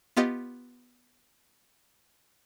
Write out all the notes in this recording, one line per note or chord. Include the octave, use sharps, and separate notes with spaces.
B3 F4 G4 D#5